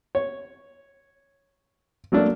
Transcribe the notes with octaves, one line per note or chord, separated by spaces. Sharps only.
C#5
F#3 A3 A#3 D4